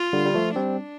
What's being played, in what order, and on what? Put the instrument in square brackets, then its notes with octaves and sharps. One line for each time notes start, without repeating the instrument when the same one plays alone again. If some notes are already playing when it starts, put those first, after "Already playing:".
Already playing: [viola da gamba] F4
[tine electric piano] D3 G3
G3
F3 A3
[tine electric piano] G3 C4 [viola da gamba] D4